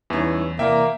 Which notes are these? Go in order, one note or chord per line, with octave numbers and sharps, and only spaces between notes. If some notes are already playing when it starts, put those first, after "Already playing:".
E2 E3 G3 C#4 D#4 E4
C3 E3 A#3 D5 E5 G5 A#5